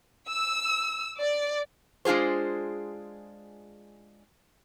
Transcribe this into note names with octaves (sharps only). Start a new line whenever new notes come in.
E6
D5
G#3 D4 F4 G#4 C5